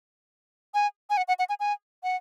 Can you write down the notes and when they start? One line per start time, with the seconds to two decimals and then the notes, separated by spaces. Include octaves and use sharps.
0.74 G#5
1.10 G#5
1.17 F#5
1.28 F#5
1.39 F#5
1.49 G#5
1.60 G#5
2.03 F#5